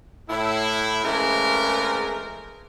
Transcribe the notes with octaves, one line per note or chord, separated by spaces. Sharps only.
A2 E4
C#3 E3 G#3 A3 C4 A#4